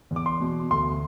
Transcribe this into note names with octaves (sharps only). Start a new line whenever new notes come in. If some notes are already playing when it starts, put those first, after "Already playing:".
E2
D6
C6
B2
D2 C6